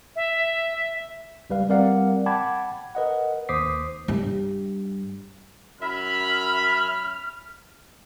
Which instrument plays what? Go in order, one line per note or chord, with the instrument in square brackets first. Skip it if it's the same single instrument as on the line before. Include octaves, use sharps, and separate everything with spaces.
[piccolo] E5
[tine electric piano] C#2 G3 B4 F5
G3 C4 A#4 D5 F5 F#5
F#5 G5 A5 B5 D6 G#6
A#4 B4 D#5 F#5
D#2 C5 D6 D#6 B6 C7
[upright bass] G2 G3
[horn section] F#2 E5 B5 [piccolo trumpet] F6